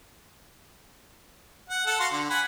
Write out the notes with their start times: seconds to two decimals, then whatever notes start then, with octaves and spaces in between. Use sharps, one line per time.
1.70 F#5
1.87 A4 F#5
2.00 F#4 F5 C6
2.12 D3
2.30 F#5 G#5 B5